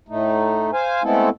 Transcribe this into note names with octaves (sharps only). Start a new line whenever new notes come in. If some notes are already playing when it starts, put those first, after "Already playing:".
A2 A3 D#4
C5 F5 G#5
G#3 A3 B3 C4 E4 A4